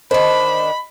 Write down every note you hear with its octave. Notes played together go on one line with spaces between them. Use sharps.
D#3 D4 C5 D#5 B5